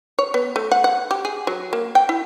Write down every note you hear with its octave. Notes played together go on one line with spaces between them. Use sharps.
C#5
B3
A3
F#5
F#5
G4
G#4
F#3
A#3
G5
E4